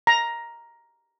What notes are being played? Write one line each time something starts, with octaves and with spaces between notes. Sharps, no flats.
A#5